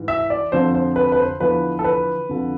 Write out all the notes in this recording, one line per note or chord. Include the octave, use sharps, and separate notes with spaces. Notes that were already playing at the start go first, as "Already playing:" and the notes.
Already playing: G#2 E3
E5
D5
F2 D3 F3 C5
C5
B4
B4
C5
E2 D3 F3 B4
A4
B4
F2 D3 F3